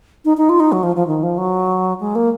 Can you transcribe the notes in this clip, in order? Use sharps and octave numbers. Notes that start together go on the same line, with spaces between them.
D#4
D#4
F4
D#4
F#3
F3
F3
D#3
F3
F#3
G#3
A#3